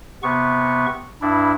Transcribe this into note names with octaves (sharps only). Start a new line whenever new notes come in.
C3 B3 C#6
G2 D4 E4